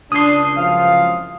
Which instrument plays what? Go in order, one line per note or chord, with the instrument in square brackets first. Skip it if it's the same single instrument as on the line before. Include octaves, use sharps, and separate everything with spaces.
[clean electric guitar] C#2 C6 [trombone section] D4 [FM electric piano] D#6
[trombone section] C2 F#2 F3 [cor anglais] F5